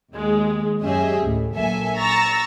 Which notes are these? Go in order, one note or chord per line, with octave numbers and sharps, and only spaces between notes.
D#2 G#3
F#2 C#4 G4 G#4 D#5 E5
D2 A2
A#1 F#3 A#3 A4 E5 G#5
A#5 C#6 E6 A6 A#6